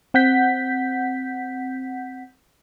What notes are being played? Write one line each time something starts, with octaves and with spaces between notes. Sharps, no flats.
C4 F#5 G6 B6